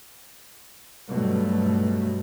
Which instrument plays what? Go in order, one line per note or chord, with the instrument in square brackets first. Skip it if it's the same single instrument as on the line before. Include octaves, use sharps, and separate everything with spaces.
[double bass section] G2 B2 F#3 A3